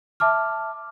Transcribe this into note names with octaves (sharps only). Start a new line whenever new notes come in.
E5 A5 D6 F6